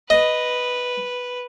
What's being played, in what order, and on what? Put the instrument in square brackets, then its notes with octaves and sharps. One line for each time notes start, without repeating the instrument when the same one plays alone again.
[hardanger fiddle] B4 [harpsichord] D#5